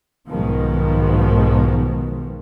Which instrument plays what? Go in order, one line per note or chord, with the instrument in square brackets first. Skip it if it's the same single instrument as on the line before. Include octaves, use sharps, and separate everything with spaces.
[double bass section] B1 G#2 B2 D#3 F3 B3